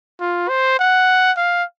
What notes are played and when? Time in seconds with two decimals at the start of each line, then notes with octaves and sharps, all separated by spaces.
0.20 F4
0.49 C5
0.79 F#5
1.37 F5